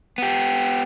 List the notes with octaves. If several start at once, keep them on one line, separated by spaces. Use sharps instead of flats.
B3 G4